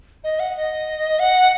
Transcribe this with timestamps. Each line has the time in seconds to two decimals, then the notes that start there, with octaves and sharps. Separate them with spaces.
0.24 D#5
0.40 F#5
0.57 D#5
1.19 F#5